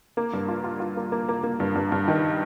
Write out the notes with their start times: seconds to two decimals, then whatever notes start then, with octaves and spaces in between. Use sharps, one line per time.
0.17 A#3
0.33 G2
0.48 F4
0.64 F4
0.80 F4
0.97 A#3
1.12 A#3
1.29 A#3
1.43 A#3
1.60 G2
1.75 G2
1.92 G2
2.08 D#3